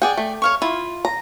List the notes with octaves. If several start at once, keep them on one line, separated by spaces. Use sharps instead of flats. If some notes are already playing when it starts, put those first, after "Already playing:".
G#4 D5 F#5 G5
A3
C#5 F5 C#6
E4 F4
A#5